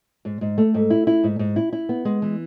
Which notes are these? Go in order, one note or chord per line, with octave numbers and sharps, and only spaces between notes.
G#2
G#2
A3
G#2
E4
E4
G#2
G#2
E4
E4
B3
G#3
E3